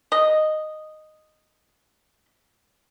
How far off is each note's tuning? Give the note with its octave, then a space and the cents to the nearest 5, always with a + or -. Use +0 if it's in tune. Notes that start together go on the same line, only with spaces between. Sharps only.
D#5 -5